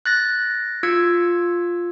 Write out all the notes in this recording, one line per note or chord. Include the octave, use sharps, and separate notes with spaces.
F#6 A6 A#6
F4 E6 G#6 C#7